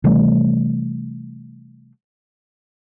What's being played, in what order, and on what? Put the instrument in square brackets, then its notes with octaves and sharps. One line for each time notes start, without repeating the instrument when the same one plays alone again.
[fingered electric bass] C3 E3 G3 A3